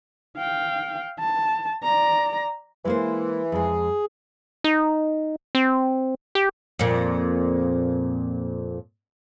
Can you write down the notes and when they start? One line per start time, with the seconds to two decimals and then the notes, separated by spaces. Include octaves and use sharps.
0.38 F5 G5
1.19 A5
1.83 D5 A#5
2.85 E3 G#3 A#3 C5
3.52 F2 G#3 G#4
4.64 D#4
5.55 C4
6.35 G4
6.79 F2 A#2